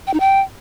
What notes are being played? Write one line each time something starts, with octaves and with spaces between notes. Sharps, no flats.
G5
D#4
G5